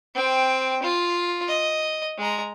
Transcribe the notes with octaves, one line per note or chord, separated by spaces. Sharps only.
C4 G5
F4
D#5
G#3 A#5